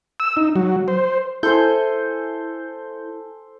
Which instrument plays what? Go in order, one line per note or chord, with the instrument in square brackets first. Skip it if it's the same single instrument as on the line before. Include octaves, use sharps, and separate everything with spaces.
[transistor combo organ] E6
D#4
F#3
C5
[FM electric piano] E4 G6 [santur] A4 C5 G#5